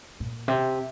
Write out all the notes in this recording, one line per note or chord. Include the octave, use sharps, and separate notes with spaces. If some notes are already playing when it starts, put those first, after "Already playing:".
A#2
C3